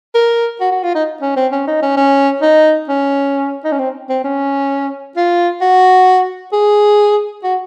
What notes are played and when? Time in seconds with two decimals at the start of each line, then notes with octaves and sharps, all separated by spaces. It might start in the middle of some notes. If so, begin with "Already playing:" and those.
0.15 A#4
0.60 F#4
0.72 F#4
0.83 F4
0.95 D#4
1.22 C#4
1.36 C4
1.52 C#4
1.67 D#4
1.82 C#4
1.97 C#4
2.42 D#4
2.89 C#4
3.64 D#4
3.72 C#4
3.79 C4
4.09 C4
4.24 C#4
5.17 F4
5.61 F#4
6.53 G#4
7.44 F#4